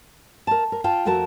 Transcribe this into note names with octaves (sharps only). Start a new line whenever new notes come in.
A#4 A5
A#4
F4 G5 A5
F2 A3 F#4 A#4 A5